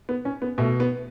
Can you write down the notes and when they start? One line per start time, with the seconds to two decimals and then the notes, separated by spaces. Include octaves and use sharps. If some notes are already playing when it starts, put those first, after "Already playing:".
0.09 B3
0.25 C#4
0.42 B3
0.58 B2 A3
0.80 B3